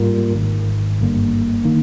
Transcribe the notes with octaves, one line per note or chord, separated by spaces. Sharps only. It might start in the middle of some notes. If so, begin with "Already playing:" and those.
Already playing: G#2 G3 A#3 F4 A#4
G#1 G#2 D#3
G1 G2 D3 G3 A#3
D#3 A#3 D#4